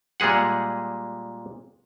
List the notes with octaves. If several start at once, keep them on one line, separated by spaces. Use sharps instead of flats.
A#2 G3 G#3 G#4 F#5